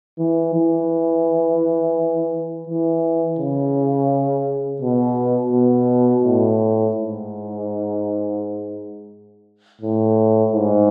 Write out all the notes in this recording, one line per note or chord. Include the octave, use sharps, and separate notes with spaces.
E3
E3
E3
C#3
B2
B2
A2
G#2
A2
G#2